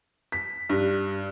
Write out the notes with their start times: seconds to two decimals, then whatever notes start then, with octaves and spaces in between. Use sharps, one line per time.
0.32 B6
0.70 G2